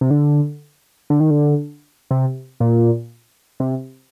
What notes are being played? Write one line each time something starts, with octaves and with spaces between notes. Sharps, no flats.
C3
D3
D3
D#3
D3
C3
A#2
C3